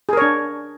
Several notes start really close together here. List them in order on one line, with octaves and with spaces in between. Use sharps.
G#4 A#4 C#5 D4